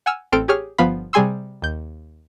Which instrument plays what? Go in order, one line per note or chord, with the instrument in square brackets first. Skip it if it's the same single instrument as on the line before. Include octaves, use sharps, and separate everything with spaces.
[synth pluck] F#5 G#5 E6 F6
A1 C4 A4 C6 F6 D7
G4 G#4 C#5 F6
G1 F3 B3 F5 B5
C3 G3 G#4 G#5 C6 E6
D#2 G6